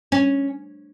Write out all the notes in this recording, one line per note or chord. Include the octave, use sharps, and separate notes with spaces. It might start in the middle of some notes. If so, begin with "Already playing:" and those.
C#4